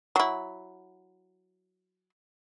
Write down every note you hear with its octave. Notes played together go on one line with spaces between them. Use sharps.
F#3 E4